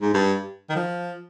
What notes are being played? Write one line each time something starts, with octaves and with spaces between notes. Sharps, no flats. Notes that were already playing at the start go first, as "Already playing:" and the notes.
G#2
G2
D#3
F3